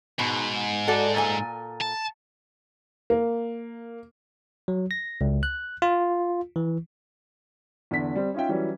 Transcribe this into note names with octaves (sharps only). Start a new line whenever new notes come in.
G#2 B2
F#4 A4 D5
A#2 A4 G#5
A5
A#3
F#3
A#6
C#2
F#6
F4
E3
E2 D3 B6
G3 C4
C#4 D#4 F4 E5 G5
E3 F#3 G3 C#4